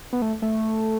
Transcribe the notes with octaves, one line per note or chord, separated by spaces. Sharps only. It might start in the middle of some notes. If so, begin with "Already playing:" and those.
B3
A3
A3